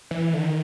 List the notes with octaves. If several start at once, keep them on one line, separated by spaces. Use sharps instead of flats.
E3
D3
D#3